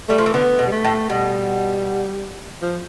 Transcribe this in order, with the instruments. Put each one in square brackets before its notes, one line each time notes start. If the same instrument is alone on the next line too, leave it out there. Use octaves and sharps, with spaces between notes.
[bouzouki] G3 [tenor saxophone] A3
[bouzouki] F3
E3
[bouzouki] D3 [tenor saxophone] B3
[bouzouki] B2
[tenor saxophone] G3
A3
[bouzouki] A2
[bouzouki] B2 [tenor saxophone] G3
[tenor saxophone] F3